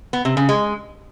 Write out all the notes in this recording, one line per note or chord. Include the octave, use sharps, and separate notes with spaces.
B3
C3
C#3
G#3